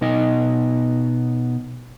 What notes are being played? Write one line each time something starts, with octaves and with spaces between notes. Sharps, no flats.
B2 B3 D#4 D#5